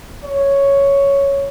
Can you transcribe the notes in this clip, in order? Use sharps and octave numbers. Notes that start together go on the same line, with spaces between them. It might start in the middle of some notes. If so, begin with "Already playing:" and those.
C#5